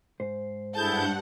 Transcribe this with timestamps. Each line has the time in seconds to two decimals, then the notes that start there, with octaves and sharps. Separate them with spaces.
0.20 G#2 C5
0.75 G2 E4 G#4 A4 F#5 A5 G6